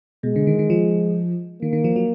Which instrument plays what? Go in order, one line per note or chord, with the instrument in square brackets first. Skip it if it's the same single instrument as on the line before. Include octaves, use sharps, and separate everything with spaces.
[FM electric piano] B2 [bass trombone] G#3
[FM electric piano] D3
D#3
D#3
F3
[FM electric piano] D#3 [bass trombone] A#3
[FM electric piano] D#3
F3
F#3